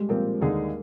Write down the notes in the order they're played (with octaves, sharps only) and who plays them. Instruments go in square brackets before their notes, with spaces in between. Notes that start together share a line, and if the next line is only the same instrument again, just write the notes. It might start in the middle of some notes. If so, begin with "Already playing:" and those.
Already playing: [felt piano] G3 G#3
[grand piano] A#2 F3 C4 [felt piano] A#3
[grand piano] D#2 D3 G#3 D#4 G#4